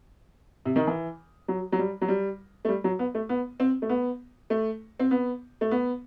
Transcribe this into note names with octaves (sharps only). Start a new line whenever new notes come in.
C3
D#3
E3
F#3
F#3
G3
F#3
G3
A3
G3
F#3
B3
A3
B3
C4
A3
B3
A3
C4
B3
A3
B3